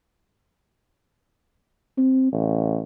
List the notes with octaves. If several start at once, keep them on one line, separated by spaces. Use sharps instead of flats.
C4
A1